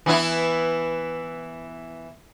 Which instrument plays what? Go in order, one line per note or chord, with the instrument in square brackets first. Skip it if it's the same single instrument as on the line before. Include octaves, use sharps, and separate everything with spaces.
[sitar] E3 B3 E4